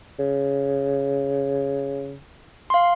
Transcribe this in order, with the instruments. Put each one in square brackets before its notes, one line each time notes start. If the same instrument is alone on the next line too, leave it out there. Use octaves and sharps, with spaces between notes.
[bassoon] C#3
[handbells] F5 C6